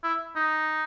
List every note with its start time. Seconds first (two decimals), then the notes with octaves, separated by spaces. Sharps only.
0.04 E4
0.36 D#4